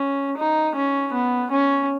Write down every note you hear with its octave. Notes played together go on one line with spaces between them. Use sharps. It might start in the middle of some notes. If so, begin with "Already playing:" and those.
Already playing: C#4
D#4
C#4
B3
C#4